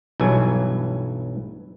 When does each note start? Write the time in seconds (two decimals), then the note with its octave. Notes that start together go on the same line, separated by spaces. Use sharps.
0.20 B1 G2 E3 F#3 G#5